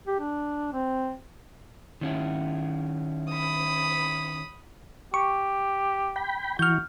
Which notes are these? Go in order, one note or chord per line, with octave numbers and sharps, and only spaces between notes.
G4
D4
C4
D#3 C#4 E4
B5 D#6
G4 C#6
G5 B5
E3 F#4 F6 G6